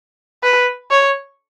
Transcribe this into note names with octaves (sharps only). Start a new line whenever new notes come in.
B4
C#5